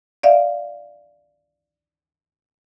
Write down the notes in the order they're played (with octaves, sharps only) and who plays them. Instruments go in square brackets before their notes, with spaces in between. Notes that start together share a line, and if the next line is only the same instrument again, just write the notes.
[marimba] D5 E5 F5